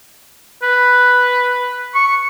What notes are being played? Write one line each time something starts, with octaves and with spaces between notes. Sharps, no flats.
B4
C#6